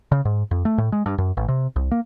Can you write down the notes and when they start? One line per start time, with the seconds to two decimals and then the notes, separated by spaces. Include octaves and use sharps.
0.12 C#3
0.25 G#2
0.51 F2
0.65 A3
0.78 A2
0.92 G#3
1.06 G2
1.18 F#2
1.37 A1
1.48 C3
1.76 C2
1.92 A#3